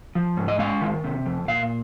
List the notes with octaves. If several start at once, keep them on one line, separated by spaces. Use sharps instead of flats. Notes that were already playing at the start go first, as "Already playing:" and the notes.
F3
G#2
D#5
G#3 F5
D#3
C3
F2
A#2 F5